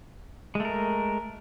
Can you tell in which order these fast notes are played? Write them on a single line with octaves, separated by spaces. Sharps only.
G#3 A3 A#4